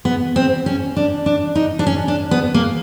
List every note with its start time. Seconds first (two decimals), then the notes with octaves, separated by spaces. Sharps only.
0.05 B3
0.36 C4
0.66 C#4
0.97 D4
1.26 D4
1.55 D#4
1.79 D4
1.87 C#4
2.08 D4
2.31 B3
2.54 A#3